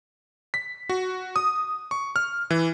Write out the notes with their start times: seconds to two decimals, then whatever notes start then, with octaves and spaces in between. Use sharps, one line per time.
0.54 B6
0.89 F#4
1.36 D#6
1.91 C#6
2.16 F6
2.50 E3